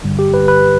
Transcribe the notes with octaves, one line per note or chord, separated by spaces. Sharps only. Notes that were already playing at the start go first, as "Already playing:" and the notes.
G2 D3 G3
G4
B4
B4